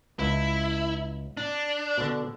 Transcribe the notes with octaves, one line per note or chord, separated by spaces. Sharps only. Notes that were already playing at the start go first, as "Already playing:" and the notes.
C#2 E4
D4
B2 D3